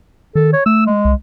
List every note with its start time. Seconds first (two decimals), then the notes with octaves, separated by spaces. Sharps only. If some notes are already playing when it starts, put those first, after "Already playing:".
0.35 D#3 A4
0.53 C#5
0.66 A3 E6
0.86 G#3
1.05 C2